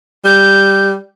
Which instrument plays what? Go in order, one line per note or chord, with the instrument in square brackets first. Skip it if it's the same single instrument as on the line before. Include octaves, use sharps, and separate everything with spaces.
[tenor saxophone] G3 [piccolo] G6